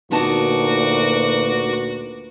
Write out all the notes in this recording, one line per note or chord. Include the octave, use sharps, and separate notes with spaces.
D2 A#2 B3 D#4 F#4 B4 A5 D6